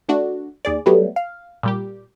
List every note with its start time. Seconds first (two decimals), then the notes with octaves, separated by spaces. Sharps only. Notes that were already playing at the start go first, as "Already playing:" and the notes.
0.09 A3 D4 F#4
0.65 D#2 G#4 D5
0.86 F#3 G3 A3 B3
1.16 F5
1.63 A#2 G3 G4